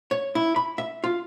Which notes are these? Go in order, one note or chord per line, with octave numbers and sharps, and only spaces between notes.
C#5
E4
B5
E5
F4